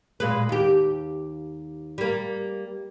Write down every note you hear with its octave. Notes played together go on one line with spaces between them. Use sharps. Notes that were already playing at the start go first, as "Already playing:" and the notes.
A#2 G#3 B4
D#2 G4
G3 A#3